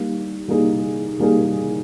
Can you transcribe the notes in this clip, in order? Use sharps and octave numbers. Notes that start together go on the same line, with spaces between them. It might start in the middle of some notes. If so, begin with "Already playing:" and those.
Already playing: G3 A#3 D#4
G3 A#3 D#4 G#4
G3 A#3 D#4 G#4